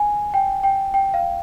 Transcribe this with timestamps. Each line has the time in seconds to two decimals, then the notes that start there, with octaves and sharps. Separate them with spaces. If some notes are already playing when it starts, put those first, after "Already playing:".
Already playing: G#5
0.34 G5
0.63 G5
0.94 G5
1.14 F5